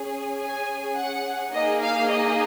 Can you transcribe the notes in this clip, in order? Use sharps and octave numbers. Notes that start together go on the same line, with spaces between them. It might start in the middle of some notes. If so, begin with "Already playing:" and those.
Already playing: C#4 G#4
G#5
F#5
A#3 D#4 G#4 D#5
F5
D#5